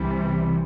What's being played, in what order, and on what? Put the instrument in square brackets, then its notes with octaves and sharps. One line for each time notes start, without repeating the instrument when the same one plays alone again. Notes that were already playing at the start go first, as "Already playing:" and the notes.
Already playing: [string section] C2 C3 E3 G3